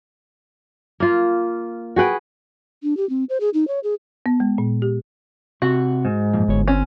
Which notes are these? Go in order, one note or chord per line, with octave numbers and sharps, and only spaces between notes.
A#3 F4
F#4 G#4 B4 G5
D4
G4
C4
C5
G#4
D#4
C#5
G#4
B3
G#3
A#2
G4
C3 C4 F#4 F#5
G#2
F#2 A#2 F3
G1 D2 C#5
C4 C#4